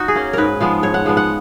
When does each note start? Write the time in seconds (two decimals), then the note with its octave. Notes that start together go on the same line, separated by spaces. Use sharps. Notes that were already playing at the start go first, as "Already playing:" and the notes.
Already playing: D#4 F#4
0.08 G#4
0.15 A#3 C#4
0.33 G#2 A#4 B4
0.61 F3 G#3 B3
0.83 G#2 C#5
0.94 F#5
1.06 F3 G#3 B3
1.17 F#5